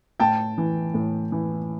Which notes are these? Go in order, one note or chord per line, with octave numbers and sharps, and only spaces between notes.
A2 G5 A5
E3
A2
E3